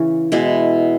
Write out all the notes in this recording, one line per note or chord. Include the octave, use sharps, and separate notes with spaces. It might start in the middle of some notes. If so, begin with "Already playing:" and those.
Already playing: C#3 E3 C#4
B2 G#3 E4